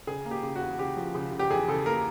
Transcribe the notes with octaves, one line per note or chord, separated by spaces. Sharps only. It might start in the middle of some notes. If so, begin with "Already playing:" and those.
C#3 G#4
A#3
G4
C#3
F#4
E2
C#3 G4
F3
C#3
C#3
G4
E2 G#4
C#3 A4
A#3 A#4